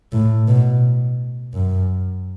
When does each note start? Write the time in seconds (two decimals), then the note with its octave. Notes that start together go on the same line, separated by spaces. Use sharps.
0.12 A2
0.48 B2
1.54 F#2